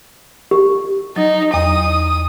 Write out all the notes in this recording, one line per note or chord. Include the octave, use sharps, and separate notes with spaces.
G4
F#3 D#4
E2 D#6